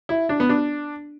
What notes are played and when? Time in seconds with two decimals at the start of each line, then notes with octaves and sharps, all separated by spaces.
0.09 E4
0.29 D4
0.40 B3
0.49 D4